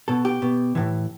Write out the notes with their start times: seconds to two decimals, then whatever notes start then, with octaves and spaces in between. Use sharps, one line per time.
0.08 B2 A4
0.25 G4
0.42 B2
0.75 A2 E3